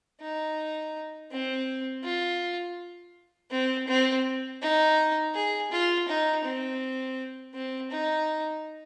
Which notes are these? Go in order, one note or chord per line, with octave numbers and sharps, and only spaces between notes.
D#4
C4
F4
C4
C4
D#4
G#4
F4
D#4
C4
C4
D#4